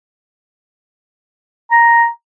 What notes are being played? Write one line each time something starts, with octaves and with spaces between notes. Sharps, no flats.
A#5